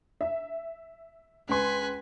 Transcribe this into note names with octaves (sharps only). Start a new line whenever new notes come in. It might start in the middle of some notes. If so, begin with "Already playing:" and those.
E5
C#2 B4 G#5 C6